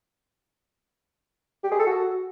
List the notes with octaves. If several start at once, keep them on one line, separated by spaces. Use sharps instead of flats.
G4
G#4
A4
F#4